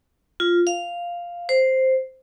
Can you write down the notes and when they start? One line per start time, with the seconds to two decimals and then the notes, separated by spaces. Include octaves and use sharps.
0.40 F4
0.67 F5
1.49 C5